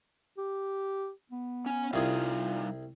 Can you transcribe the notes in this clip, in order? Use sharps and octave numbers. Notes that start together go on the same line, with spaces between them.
G4
B3
C#4 G#5
C2 G3 D#4 F4 G#4 F5 D#6